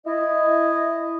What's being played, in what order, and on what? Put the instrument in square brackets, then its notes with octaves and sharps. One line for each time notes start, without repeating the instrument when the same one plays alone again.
[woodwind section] E4 D#5